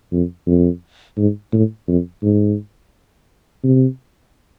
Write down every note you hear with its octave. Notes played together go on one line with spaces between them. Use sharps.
F2
F2
G#2
A2
F2
G#2
C3